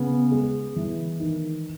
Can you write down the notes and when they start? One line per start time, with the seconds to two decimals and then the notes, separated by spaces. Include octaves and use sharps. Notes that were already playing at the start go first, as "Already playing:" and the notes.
Already playing: C#3 B3
0.31 G#3
0.76 E3
1.20 D#3